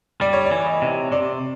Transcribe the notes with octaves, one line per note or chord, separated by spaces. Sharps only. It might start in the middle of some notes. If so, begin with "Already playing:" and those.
G3 D5
C#5
D5
E3
D#5
C3
C3 D5